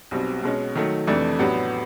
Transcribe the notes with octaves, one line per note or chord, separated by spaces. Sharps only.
B1 B2 G3 C4
B2 G#3 C#4
D#3 F#3 A3
F2 C3 E3 A3 D4
A2 F#3 B3 D4 G4